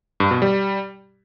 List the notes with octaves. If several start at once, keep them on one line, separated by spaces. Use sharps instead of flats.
G2
B2
G3